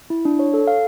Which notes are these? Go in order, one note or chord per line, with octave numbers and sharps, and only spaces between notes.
E4
D4
C#5
A4
F5